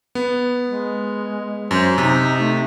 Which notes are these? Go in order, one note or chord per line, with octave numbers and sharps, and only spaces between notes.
B3
G#3
F#2 C5
C3 D#4
A3